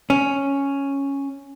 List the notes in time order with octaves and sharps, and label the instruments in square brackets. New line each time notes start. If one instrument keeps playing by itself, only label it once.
[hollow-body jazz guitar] C#4